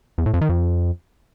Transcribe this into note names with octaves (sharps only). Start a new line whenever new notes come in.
E2
A2
F2
D#3
F2